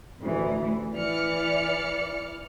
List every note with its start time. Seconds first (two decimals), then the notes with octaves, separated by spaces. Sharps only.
0.20 A1 D2 E3
0.94 E3 D5 F6 C#7